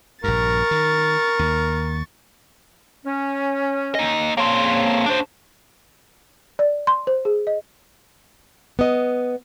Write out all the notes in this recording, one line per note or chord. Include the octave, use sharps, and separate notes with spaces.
A#1 G2 A#4 C#6 A6
D#3
D#2
C#4
A#3 D#5
C#3 A#3 C4 C#5 A5
D4 C5
D5
C6
C5
G#4
D#5
B3 D#5